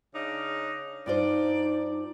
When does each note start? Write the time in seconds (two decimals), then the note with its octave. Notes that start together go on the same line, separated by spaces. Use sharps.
0.14 C#3 D4 D#4
1.06 G2 D#4 F4 C5 D5